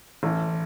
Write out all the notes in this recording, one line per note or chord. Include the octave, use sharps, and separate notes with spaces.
A1